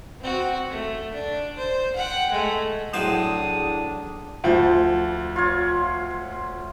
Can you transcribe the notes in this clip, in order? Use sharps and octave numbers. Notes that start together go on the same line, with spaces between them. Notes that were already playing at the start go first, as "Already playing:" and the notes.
C4 F#4
A3
D4
C5
F#5 G5
G#3 A3
A2 F#3 A3 D4 E4 G#4 C5 D#6
D2 F3
F4 C#5